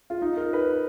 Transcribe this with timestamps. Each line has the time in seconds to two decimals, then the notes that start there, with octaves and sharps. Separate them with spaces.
0.10 F4
0.21 D#4
0.37 A#4
0.53 B4